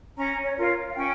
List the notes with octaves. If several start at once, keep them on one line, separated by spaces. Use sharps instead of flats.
C#4 A#5
C#5
F4 A#4
F5
C#4 G5